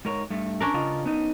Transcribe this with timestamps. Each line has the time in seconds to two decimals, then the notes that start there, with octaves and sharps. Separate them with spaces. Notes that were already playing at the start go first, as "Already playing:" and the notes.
0.05 G#2 A#4 C#5
0.30 G2 A3
0.60 C#4 D4 A#4
0.74 C#3 F4 D#5
1.06 B3 D#4